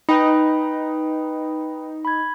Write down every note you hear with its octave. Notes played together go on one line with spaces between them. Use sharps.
D#4 B4 G5 B5
B5 G#6